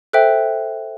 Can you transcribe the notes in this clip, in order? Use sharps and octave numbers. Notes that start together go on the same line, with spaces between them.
A4 C5 E5 G5 F#6